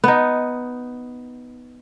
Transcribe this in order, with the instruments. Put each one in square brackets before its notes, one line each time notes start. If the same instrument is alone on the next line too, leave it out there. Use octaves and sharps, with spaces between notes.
[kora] B3 D#4